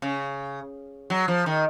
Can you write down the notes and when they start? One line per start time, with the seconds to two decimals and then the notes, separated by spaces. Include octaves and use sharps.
0.02 C#3
1.10 F#3
1.28 F3
1.46 D#3